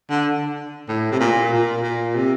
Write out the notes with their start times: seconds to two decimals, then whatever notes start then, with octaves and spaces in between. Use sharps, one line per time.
0.09 D3
0.88 A2
1.12 C3
1.20 A#2
1.52 A#2
1.83 A#2
2.15 C3